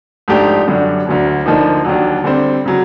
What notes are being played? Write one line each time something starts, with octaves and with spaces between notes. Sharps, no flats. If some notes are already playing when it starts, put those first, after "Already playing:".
G#2 F3 A3 D4 G4
F#2 D3 G3
D2 D3 F#3
D2 D3 F3 A#3 D#4
D#2 D3 F#3
D3 G3 C4
C#3 F#3